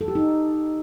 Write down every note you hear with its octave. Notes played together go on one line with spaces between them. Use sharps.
A4
G4
D#4